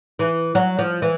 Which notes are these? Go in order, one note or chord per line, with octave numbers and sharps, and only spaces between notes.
E3
F#3
F3
E3